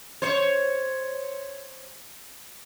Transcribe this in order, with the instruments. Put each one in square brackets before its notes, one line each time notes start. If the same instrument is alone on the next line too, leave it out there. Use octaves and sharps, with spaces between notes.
[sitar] C5 C#5